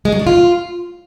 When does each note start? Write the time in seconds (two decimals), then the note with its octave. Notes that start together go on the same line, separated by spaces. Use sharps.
0.05 G#3
0.12 F#3
0.19 D4
0.27 F4